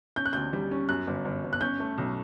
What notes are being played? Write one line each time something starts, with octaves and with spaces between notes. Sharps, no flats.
C#4 G6
F#6
D2 G6
G3
C#4
F#2 F#6
G1
G1
G1
F#6
C#4 G6
A3
B1